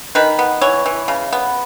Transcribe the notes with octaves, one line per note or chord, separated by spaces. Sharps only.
D#3 B4
B3
E3 C#5
E3
C#3
B3